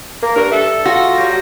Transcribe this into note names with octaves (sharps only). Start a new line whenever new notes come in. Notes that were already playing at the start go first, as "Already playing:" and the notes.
A#3 A#4
G2 D4 F#4 A#4
A4 E5
F4 F#4 A#6
A2 F#3 G3